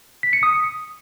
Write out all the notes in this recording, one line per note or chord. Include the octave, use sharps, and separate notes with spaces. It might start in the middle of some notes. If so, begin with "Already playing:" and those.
B6
C#7
D#6